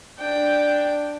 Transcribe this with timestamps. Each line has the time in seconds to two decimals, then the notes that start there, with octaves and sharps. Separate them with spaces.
0.18 D4 G5